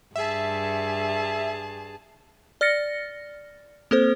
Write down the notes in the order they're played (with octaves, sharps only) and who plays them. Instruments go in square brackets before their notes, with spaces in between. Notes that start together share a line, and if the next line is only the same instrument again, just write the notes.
[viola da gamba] G2 [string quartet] G#4 A5 [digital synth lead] E5
[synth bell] D5 F6 A6 A#6 C#7
A#3 C4 A4 C5